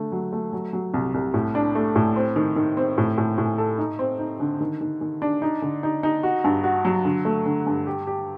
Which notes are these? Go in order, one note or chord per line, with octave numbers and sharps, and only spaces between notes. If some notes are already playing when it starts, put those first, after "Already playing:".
Already playing: D3 A3
F#3
A3
F#3
F#3
C2
C2
A2
D4
A3
A2
C4
D#3
D#3
C4
A2
A2
A2
A4
D#4
C4
D#4
D3
D#3
D#3
D#3
D4
D#4
D3
D#4
D#4
F#4
G2
F#4
F#3
D3
A3
D3
G2
G4
G4